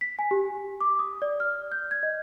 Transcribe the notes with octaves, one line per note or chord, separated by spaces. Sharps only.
B6
G#5
G4
D6
D#6
D5
F6
G6
G#6
D#5